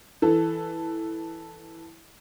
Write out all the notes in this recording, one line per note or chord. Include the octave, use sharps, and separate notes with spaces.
E3 A4